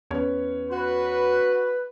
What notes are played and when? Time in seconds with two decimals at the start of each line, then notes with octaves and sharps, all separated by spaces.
0.11 E2 B3 C#4 C#5
0.71 F#4 B4